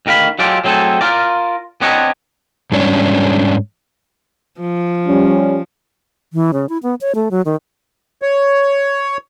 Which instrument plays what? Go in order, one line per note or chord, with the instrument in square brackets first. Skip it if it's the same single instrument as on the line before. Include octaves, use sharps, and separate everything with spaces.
[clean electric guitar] D2 D#3 A#4 F5 B5
F#3 G#3 F4 G4 A4 D5
F#3 A3 C4 E4 G#4 A4
F4 A#4 D5
B3 C4 D4 C#5 D#5 F#5
[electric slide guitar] G#2 G3 C#4 D4 C#5
[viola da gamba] F3
[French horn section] G3 C#4
[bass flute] E3
C#3
E4
B3
C#5
A3
F#3
D#3
[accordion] C#5